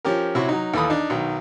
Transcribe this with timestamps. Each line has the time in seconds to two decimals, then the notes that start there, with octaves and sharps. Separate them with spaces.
0.05 F3 C#4 G4 A#4
0.35 C3 E4 F#4 C#5 C#6
0.49 F#3 D#4
0.74 D#2 E3 A4 F5 B5 D#6
0.90 D4 D#4
1.10 B1 D#3 F#3